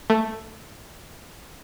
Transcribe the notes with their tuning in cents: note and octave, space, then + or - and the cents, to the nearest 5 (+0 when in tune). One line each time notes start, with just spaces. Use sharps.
A3 +5